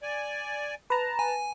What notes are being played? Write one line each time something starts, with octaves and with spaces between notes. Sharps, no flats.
D5 G#5
B4 A5 A#5
G#5